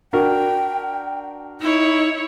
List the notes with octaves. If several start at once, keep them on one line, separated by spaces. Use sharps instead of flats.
D4 F#4 A#4 G5
D#4 E4 C#5